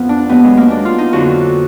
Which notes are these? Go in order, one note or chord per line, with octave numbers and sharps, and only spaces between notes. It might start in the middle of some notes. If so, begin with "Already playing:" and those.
Already playing: F2 F3 B3
D4
D#2 D#3 F#3 B3
G#3
A#3
D4
F4
D#4
F2 D3 F#3 F#4